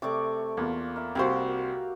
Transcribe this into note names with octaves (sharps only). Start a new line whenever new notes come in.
C3 A3 D5 C#6 D6
E2 A#3 F4
A#4 E5
C2 A#3 F#4 G4 C5 F5